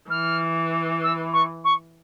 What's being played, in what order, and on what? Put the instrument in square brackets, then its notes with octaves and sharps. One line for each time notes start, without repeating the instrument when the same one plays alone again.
[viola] E3 [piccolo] F6
[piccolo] E6
C#6
C#6